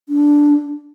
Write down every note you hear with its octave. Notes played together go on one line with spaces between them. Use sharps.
D4